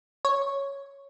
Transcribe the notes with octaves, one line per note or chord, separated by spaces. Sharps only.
C#5